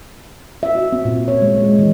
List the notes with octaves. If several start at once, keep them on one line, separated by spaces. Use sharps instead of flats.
E5
F#4
C4
A#2
C#5
G#3
G#3
E3